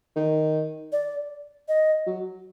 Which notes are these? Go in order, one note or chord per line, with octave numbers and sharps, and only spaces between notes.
D#3
D5
D#5
F#3